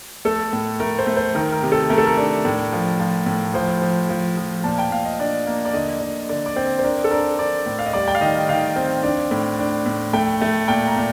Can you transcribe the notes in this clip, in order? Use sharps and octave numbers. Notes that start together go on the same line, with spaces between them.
A3 A4
A2
A3 A#4
C5
A3
C5
D#3 A#4
A#4
C3
A4
A3 A#4
A4
A#4
D4
A2
F3
F3
A2
F3 C5
F3
F3
F3
A#2 A5
G5
A#2 F5
D#5
D4 D5
A#3
D5
D3 D#5
D3 D#5
D3 D5
D5
C4 C5
C5
D4 A#4
A4
D4 A#4
D4 D5
A2
F5
D#5
G3 D5
G5
F5
D#3 D#5
D#3 F5
C4
D4
A2
D4
A2
A3 G5
A3
A#2 G5
A#5
A#2